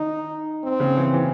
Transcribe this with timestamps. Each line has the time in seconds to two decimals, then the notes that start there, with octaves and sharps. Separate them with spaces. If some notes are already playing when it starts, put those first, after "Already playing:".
Already playing: D#3 D#4
0.64 C4
0.80 C#3
0.97 E3
1.13 E3